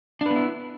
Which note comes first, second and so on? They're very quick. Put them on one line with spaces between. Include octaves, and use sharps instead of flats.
D4 B4 B3 E4